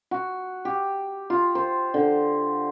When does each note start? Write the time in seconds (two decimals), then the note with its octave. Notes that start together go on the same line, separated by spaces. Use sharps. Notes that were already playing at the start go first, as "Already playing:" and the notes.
0.11 F#4
0.65 G4
1.30 F4
1.55 C5
1.94 D3